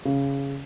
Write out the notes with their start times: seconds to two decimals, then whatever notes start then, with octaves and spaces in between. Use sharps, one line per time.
0.05 C#3